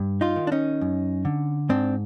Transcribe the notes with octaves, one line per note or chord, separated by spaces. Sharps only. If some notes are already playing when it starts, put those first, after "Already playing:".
Already playing: G2
D#4 F4
D#3
D4
C#4 D#4
F#2
D3
G#2 C4 D4